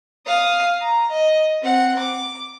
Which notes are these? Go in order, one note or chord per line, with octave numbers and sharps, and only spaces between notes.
F5 D#6
A#5
D#5
C4 F#5
D6